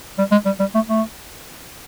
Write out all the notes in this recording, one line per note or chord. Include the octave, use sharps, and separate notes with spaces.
G3
G#3
G3
G3
A3
A3